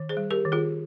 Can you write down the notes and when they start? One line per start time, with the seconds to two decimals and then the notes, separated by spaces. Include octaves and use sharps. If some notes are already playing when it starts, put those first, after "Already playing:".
Already playing: D#3
0.09 G#4 C5
0.17 G3
0.31 G4 A#4
0.45 D#3
0.52 F4 G#4